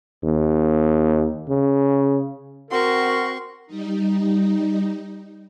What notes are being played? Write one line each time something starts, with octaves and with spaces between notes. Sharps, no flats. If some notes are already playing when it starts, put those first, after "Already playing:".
D#2
C#3
C4 F#4 A#4 C6 C#6
G3 D#4